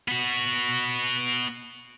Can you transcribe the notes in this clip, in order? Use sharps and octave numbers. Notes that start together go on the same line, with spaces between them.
B3 F#4